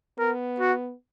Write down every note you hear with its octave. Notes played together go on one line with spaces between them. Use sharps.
B3 A#4
F#4